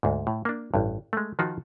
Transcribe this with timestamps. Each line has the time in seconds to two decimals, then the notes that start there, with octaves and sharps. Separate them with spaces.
0.03 D2 G#2
0.27 A2
0.45 A#3 D4
0.74 A1 G2
1.13 G#3 A3
1.39 D#3 F3 D#4 F4 F#4